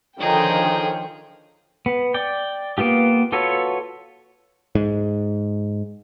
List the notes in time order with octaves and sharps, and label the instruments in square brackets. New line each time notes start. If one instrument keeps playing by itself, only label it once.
[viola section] D3 D#3 F3 [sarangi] D#4 [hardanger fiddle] G#4 C#5 [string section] G5
[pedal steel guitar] B3
D5 G5
A#3 B3 F4 G4
F4 F#4 A4 B4 C#5
[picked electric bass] G#2